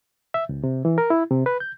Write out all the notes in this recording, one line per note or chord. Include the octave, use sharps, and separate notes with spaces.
E5
C#2
C3
E3
A#4
E4
C3
B4
G6